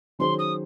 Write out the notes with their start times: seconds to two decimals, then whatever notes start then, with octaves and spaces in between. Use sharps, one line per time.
0.19 D#3 F#3 C#4 G#4 C5 C6
0.38 D#6